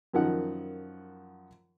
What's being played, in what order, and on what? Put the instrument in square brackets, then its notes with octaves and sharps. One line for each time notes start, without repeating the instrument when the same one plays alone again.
[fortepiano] F#2 D#3 F3 D#4 F#5